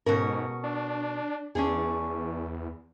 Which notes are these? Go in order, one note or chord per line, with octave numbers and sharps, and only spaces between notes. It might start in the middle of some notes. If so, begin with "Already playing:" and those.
G#2 B2 C#4 A#4
D4
E2 C#4 D4 G#4